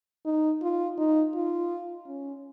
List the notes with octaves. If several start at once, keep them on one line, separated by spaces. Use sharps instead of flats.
D#4
F4
D#4
F4
C#4